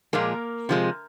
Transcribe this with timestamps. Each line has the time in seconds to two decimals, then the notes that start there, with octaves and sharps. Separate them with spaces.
0.13 A#2 F3 G#3 A#3 A#4
0.69 C3 F3 G#3